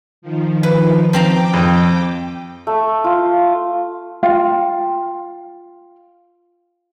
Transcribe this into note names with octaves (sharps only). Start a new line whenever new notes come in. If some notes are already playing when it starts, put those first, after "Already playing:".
D#3 F3
B4
F3 C4 G5 A#5 D6
F2
A3
F4
F4 F5 G5